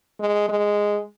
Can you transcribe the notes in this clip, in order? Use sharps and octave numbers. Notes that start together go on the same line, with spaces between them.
G#3
G#3